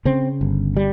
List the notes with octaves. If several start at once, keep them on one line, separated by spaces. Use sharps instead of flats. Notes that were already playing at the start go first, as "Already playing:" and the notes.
C#3 C4
G1
G3